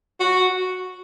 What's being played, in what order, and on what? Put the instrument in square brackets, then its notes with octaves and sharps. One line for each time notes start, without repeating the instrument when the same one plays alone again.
[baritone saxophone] F#4